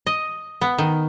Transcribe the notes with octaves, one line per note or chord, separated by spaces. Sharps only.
D#5
B3
D#3